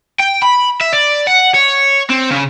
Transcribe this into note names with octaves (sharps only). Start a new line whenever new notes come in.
G5
B5
E5
D5
F#5
C#5
C4
C#3